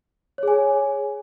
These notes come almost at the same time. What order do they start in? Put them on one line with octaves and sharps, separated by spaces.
C#5 G#4 G#5